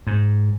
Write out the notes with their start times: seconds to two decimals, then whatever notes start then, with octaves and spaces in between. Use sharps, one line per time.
0.07 G#2